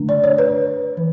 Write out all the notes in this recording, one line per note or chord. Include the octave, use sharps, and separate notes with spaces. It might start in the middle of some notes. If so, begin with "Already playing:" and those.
Already playing: D3 A3 D4
D5
C#5
B4
E3